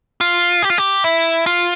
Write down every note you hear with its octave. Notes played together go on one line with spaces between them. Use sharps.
F4
G4
F4
G4
E4
F4